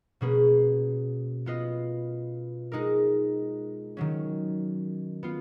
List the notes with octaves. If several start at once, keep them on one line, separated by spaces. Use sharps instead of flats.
B2 A#3 C#4 G#4 B4
B3 F4 B4 D#5
G#3 D#4 A#4
D#3 F#3 C#4
B3 F4